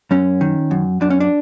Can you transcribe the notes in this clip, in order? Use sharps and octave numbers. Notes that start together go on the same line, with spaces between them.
F#2 C#4
D#3
F#2
F#2 D4
C#4
D4